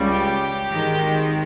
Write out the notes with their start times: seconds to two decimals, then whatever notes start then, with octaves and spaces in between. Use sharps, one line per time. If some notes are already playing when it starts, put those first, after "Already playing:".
Already playing: C#2 C#3 G3
0.11 G4
0.70 G#1 G#2 D#3 G#3